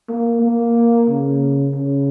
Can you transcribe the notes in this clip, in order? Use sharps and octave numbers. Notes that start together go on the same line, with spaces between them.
A#3
A#3
C#3
C#3